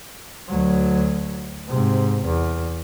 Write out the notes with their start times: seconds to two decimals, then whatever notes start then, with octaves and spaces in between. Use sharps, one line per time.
0.49 D2 F#3
1.68 G#2 C3
2.25 E2